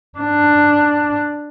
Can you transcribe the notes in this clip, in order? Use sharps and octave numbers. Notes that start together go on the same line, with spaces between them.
D4